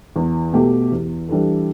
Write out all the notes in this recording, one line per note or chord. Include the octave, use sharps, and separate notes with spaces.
E2
B2 A3 G4
E2
E3 G3 D4 A4